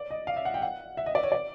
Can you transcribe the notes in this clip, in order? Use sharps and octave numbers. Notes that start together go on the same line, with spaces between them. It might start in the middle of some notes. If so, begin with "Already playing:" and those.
Already playing: D5
D#5
F5
E5
F#5
G5
F#5
E5
D#5
D5
C#5
D5